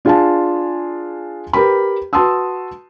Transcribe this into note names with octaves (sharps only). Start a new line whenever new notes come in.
D4 F4 G#4 F5 G#5 A5
G4 A#4 B4 B5
F#4 B4 A5 C6 D#6 E6